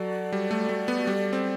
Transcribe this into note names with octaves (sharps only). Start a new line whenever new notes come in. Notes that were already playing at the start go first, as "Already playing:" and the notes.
Already playing: F#3 F#4 A4 D5
G3
A3
A3
B3
G3
C4